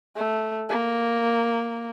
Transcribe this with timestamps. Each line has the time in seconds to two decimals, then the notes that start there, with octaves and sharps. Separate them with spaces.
0.17 A3
0.69 A#3